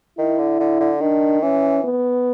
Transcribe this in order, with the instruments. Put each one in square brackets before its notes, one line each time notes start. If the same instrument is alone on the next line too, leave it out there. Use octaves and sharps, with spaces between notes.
[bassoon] D#3 [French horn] E4
[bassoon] D3
D3
D3
[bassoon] D#3 [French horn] D4
[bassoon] E3 [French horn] C#4
[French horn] B3